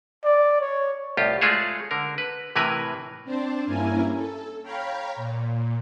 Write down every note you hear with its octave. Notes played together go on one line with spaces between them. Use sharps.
D5
C#5
C2 A2 F4 G4
G#3 A3 F4 G#4 C5 C#5
D3 A#4
B4
A2 C3 E3 A#4 B4 G#5
C4 D4 C5 A5
G2 A#3 C#4 E4 A#4 G#5
A4
C#5 F5 G5 A#5 B5
A#2